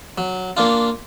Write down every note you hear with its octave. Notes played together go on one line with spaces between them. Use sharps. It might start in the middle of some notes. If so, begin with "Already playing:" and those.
F#3
A#3 D4 F4